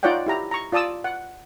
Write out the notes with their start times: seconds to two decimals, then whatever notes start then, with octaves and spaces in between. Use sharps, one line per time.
0.03 D#4 F4 C#5 D5 F#5 G5
0.26 E4 G4 A#5
0.51 A#5 C#6
0.72 F4 D5 A5 D#6 E6
1.04 F#5